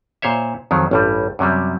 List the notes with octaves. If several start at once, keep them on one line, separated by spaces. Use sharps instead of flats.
A#2 C5 C#5 E5
F2 D#3 F#3
A1 G2 G3
F#2 C3 F#3 G3